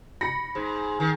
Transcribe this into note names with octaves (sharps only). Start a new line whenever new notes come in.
B5 A#6 C#7
G#2
D#3